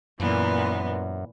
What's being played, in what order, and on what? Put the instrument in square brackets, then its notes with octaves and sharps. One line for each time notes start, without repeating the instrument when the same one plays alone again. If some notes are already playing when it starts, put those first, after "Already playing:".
[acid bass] F#2 [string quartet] A#2 E3 B3